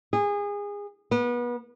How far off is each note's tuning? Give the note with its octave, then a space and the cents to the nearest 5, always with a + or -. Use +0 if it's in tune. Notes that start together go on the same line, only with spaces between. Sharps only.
G#4 -25
B3 -30